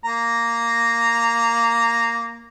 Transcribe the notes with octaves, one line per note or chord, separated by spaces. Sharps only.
A#3 A#5